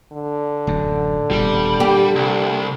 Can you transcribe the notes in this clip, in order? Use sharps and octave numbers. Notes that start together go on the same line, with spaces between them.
D3
D1 F#2
D#1 E2 C3 G3
A#3 G4
C2